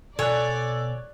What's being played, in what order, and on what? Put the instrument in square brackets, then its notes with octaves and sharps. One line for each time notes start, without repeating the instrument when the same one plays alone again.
[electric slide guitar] B2 G#5 [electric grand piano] A4 F#6 [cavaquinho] C#5 [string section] D5